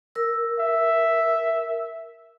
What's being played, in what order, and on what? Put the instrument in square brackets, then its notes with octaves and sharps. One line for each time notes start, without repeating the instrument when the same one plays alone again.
[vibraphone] A#4 E6
[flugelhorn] E5